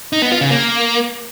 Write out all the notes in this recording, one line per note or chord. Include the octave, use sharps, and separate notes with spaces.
D#4
B3
F4
C#3
A#3